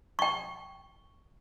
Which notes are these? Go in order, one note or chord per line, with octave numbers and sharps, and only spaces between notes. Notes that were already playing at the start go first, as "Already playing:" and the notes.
G5 C#6